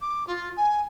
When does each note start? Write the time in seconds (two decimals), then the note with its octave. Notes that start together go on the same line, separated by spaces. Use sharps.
0.02 D6
0.27 F4
0.57 G#5